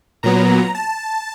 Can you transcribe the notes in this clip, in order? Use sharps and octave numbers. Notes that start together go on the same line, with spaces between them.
A#2 F#3 B3 A#5
A5